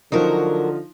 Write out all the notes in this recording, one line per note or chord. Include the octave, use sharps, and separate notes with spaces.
D3 F3 F#3 D#4 F4 F#4 A#4